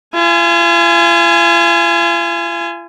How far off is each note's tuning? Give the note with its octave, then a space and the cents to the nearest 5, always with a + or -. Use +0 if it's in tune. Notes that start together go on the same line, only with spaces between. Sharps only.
F4 -40 G#5 +0